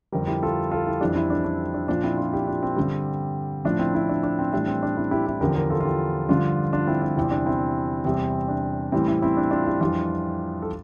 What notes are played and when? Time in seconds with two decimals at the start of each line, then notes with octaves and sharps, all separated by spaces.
0.12 F2 D3 G3 G4 A#4
0.27 E4 G4
0.43 F4 A4
0.71 F4 A4
0.86 E4 G4
1.01 F2 E3 G3 D4
1.15 C4 E4
1.30 D4
1.45 D4
1.74 D4
1.88 A#2 F3 D4
2.03 C4 E4
2.18 D4 F4
2.33 E4 G4
2.47 D4 F4
2.63 C4
2.76 G2 D3 G3
3.65 A2 F3 D4
3.79 C4 E4
3.94 C4 E4
4.09 D4
4.23 D4
4.39 C4
4.52 A2 E3 G3 D4
4.68 C4
4.83 D4
4.97 C4 E4
5.11 E4 G4
5.26 E4 G4
5.41 E2 D3 F3 G4 A#4
5.56 G4 A#4
5.70 F4 A4
5.80 F4
5.85 E4 G4
6.29 G2 D3 F3 D4 F4
6.73 D4 F4
6.87 C4 E4
7.02 D4
7.17 E2 C3 E3 G3 C4
7.31 D4
7.46 C4 E4
8.05 E2 C3 G3 C4
8.49 D4
8.92 A2 E3 G3 C4 E4
9.08 C4 E4
9.22 C4 E4
9.37 D4
9.51 D4 F4
9.66 E4 G4
9.81 F2 E3 G3 D4 F4
10.62 A4